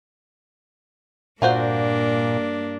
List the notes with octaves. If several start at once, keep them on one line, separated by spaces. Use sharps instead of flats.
G2 A#2 A#3 D4 F4 F#4 C5